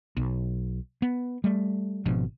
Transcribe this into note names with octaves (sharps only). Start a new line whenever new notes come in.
B1
B3
G3 A3
G#1 B2 F3 D4